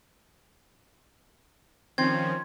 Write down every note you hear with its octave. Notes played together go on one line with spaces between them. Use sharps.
D#3 F3 C4 C#4 C6 G#6